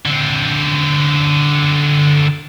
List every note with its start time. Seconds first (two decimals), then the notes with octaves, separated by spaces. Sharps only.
0.06 D3 C4